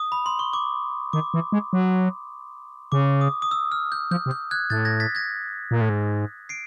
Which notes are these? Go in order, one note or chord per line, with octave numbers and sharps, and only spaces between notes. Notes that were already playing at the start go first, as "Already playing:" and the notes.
Already playing: D#6
B5
C6
C#6
D6
D#3 D6
E3
G#3
F#3
C#3 D6
D#6
D#6
E6
F6
G6
F3 G6
C3
G6
F#6 G#6
A2 G6 A6
G#6 A#6
A6 B6
G#6 A#6
A#2
A2
G#2
C7 D7